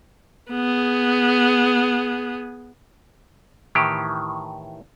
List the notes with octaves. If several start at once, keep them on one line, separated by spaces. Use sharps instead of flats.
B3 G#4
A2 D#3 E3 G4